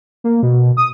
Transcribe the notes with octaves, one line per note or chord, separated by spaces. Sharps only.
A#3
B2
D#6